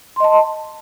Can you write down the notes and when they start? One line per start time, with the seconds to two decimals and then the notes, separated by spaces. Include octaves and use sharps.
0.16 C6
0.20 D#5
0.24 A5